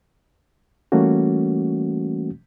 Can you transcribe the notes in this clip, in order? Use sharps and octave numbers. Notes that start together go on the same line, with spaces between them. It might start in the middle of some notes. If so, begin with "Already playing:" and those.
E3 G3 A3 A#3 C#4 F#4